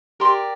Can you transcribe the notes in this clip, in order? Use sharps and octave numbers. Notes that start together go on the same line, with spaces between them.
G4 A#4 D5 C6